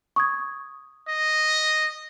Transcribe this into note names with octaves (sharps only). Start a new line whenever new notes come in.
C#6 D#6 G#6
D#5